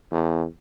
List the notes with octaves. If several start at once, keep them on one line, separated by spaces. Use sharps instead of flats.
E2